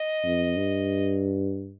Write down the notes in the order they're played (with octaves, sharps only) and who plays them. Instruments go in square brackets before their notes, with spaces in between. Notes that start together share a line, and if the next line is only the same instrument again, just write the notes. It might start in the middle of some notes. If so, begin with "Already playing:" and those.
Already playing: [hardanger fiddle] D#5
[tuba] F2
G2